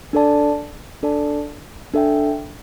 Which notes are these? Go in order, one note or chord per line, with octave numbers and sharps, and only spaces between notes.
D4 A4 D5 A5
D4 A4 D5 A5
D4 A4 E5 G5